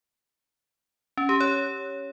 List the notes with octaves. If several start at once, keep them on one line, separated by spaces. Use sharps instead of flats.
C#4
G4
C#5